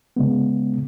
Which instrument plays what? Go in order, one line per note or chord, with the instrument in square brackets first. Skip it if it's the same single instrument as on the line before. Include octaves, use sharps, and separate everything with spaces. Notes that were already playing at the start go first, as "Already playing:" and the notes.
[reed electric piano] C#3 G#3 B3